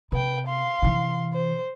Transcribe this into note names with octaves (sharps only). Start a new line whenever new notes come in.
C3 B4 G5
F5 C6
C3 E3
C5